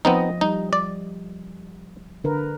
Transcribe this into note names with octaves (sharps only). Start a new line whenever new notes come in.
F3 B3 C4 D#4 D#5
G3 D#4
D5
D3 A#4 B4